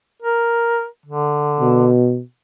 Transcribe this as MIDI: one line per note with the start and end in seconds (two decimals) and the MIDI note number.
0.22 0.85 70
1.06 1.92 50
1.61 2.21 47